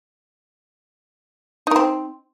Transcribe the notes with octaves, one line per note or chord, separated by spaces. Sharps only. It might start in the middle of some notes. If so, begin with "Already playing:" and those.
C4 D#4 A#4